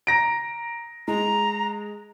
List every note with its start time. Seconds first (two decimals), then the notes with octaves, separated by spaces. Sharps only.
0.07 A#5 A#6 D7
1.08 G#3 A#5